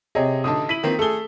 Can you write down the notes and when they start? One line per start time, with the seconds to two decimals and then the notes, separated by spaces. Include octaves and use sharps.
0.15 C3 G#4 C#5 D#5
0.44 A1 D3 D#4 A5 D#6
0.69 E4 B6 D#7 F#7
0.83 D#3 A#3 C4
0.99 A3 G#4 A4 G7